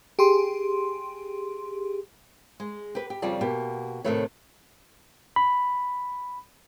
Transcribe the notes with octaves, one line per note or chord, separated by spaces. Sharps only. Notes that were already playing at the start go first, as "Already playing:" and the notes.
G4 G#4 C6
G#3
G4 B4
G4
F2 C#3 G3 F4 D5 A5
B2 A#3 G4
A2 C3 D#3 A3 B4 C#5
B5